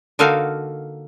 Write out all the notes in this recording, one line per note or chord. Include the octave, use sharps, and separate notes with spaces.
D3 A#3 D#4 F#4 A4 F5